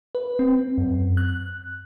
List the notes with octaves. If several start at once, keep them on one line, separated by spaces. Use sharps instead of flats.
B4
C4
F#2
F#6